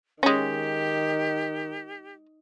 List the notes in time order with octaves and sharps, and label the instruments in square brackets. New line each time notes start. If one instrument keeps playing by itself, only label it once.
[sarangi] D#3 [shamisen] G#3 C#4 [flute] G4